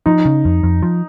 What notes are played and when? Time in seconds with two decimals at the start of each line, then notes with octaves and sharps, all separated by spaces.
0.06 F3 D#4
0.25 C#3
0.45 F2
0.63 F2
0.83 F3